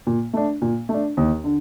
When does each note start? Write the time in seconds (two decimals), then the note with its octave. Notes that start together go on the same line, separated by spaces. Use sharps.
0.07 A#2
0.33 A3 D4
0.62 A#2
0.89 A3
0.94 D4
1.17 D#2
1.44 D3